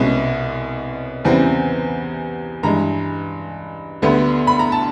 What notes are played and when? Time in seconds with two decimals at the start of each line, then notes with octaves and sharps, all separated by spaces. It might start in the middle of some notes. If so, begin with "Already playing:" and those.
Already playing: C2 B2 G#3 C#4
1.25 E2 C#3 E3 G3 C4
2.63 G2 E3 G#3 A#5
4.02 D2 D3 G3 B3
4.47 B5
4.59 A#5
4.72 A5